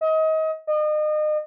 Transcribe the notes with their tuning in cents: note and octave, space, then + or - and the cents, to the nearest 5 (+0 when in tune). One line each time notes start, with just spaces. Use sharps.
D#5 +30
D#5 -35